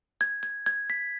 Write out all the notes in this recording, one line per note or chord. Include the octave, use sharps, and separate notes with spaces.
G#6
G#6
G#6
B6